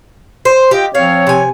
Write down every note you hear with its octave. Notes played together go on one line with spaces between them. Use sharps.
C5
F4 G4 D#5 G5
F3 C4 C#5 F5
C3 G#5